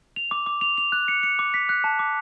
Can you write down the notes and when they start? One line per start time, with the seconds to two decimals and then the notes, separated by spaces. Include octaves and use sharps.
0.16 F7
0.31 D6
0.46 D6
0.61 F7
0.78 F7
0.92 F#6
1.08 C#7
1.23 C#7
1.39 D6
1.54 B6
1.69 F#6
1.84 A5
1.99 D6